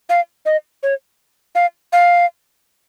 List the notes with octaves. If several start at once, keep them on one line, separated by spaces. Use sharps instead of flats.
F5
D#5
C#5
F5
F5